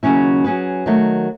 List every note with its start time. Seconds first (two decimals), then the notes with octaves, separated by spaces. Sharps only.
0.03 D#2 C#3 F#3 C#4 E4
0.44 F#3 C#4 G#4 B4
0.86 D#3 F#3 A3